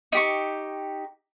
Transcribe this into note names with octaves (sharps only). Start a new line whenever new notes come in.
D#4 G4 C#6